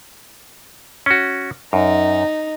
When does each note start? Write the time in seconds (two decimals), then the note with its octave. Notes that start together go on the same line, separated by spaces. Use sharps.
1.06 C#4 F#4
1.73 F#2 D#4